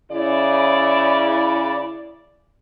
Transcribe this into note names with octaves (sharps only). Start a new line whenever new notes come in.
C#3 E4 D5